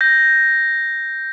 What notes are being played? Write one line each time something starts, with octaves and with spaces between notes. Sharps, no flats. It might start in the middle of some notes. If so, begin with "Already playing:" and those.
G6 A#6